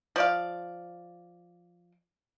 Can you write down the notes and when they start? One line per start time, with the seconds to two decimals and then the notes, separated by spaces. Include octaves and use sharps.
0.16 F3 D5 F5